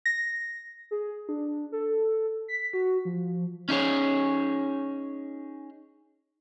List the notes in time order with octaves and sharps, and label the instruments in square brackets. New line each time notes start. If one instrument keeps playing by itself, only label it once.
[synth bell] A#6
[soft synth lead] G#4
D4
A4
B6
F#4
F3
[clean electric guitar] C#4 D#4 G#4 C#5